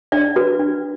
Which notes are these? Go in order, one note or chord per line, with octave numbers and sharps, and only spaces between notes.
D4 D5
F#4 B4
D4